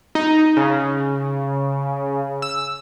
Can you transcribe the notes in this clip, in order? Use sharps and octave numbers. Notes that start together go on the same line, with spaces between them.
D#4
C#3
E6